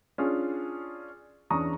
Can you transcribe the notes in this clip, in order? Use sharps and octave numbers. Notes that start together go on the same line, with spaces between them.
C#4 D4 F4 G#4
E2 C#4 D4 A#5 C#6 D#6